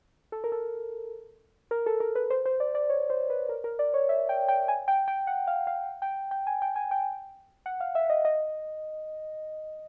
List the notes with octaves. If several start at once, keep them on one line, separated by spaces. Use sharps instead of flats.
A4
A#4
A4
A#4
A4
A#4
B4
C5
C5
D5
D5
C#5
C5
B4
A#4
A#4
D5
C#5
E5
G5
G5
G#5
G5
G5
F#5
F5
F5
G5
G5
G#5
G5
G#5
G5
F#5
F5
E5
D#5
D#5